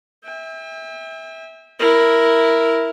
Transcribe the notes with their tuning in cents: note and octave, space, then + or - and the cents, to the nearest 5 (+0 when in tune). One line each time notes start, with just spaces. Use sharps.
E5 -20 G5 +40
E4 +0 A#4 +0